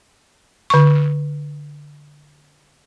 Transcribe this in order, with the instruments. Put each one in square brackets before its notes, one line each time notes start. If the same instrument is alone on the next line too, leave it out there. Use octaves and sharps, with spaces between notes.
[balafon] D3 C#6